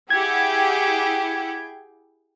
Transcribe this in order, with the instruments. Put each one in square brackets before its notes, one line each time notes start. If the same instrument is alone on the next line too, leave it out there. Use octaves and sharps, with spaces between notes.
[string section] E4 G4 F#5 [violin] G#4 G5 [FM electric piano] G#6